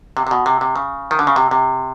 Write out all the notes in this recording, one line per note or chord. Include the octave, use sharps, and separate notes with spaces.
C3
C3
B2
C3
C3
C#3
D#3
D3
C#3
C3
C3